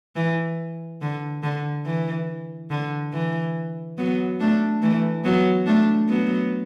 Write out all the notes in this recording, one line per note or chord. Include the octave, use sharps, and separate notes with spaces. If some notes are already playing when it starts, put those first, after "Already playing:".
E3
D3
D3
E3
D3
E3
F#3 B3
A3 D4
E3 A3
F#3 B3
A3 D4
F#3 B3